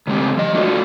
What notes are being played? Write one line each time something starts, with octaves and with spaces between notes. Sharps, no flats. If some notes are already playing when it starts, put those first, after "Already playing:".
C#3 G#3 A3 C4 G4
F3 D#5
F#3 A3 D4 F4 F#4